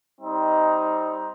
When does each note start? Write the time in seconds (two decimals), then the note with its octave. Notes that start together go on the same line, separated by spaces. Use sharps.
0.21 G3 C4 D#4